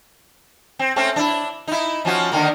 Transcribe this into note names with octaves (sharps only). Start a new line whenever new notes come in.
C4
A3 C4 C#4
D4 E4
D#4 E4
F3 C#4 F#4
D3 D#3 A#3